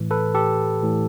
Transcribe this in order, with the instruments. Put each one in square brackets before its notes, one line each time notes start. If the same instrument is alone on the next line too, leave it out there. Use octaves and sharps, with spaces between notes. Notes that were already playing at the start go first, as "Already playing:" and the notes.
Already playing: [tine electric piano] A2 E3
A4 B4
G4 A4
A2 E3